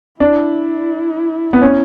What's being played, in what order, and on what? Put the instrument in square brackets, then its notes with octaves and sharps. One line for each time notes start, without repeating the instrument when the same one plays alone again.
[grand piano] D4 [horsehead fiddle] E4
[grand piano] B3
C#4